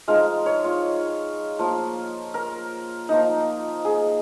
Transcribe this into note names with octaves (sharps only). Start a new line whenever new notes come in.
F3 G#3 D#4 F5
C#5
F4
F3 A#3 F4
A#4
F3 A#3 D#4
G#4